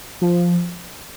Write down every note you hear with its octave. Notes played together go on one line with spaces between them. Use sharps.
F3